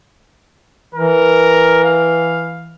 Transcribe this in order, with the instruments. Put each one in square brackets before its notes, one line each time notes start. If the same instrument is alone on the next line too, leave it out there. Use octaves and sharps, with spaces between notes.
[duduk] E3 [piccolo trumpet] A#4
[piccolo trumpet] F5